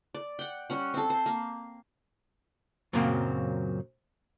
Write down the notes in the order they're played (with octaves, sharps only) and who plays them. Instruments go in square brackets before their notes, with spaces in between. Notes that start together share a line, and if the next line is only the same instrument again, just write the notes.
[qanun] D5
F#5 G5
G3 C#4 F#5
C4 A4
C5
A#3
[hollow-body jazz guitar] F#2 A#2 C#3 F#3 A#3 C4